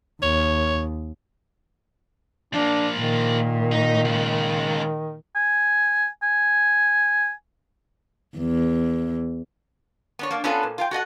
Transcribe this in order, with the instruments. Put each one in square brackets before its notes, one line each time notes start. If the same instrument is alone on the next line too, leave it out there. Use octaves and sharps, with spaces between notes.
[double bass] D#2 [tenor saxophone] C#5
[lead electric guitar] F3 A#3 [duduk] D4
[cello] A#2 [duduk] D#3
[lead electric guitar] D#4
C#2 C#3
[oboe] G#5
G#5
[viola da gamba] E2
[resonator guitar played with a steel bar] B3 D4 C#5
A#3 D4
B3 C#4 D4 F4 A4 B4
A#2
F4 A#4 G5
F#4 A4 D#5 F#5